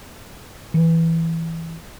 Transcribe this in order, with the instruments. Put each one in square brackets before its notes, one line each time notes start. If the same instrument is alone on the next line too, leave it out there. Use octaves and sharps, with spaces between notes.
[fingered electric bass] E3